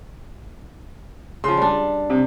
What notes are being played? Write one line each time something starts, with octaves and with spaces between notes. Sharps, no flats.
C#3 F3 C6
G3 D4
C3